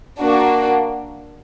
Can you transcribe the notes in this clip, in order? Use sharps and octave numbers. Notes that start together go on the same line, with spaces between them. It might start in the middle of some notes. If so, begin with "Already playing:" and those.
A#3 D4 F#4